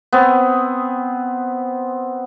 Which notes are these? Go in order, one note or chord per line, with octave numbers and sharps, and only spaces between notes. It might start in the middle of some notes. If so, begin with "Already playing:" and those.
B3 C4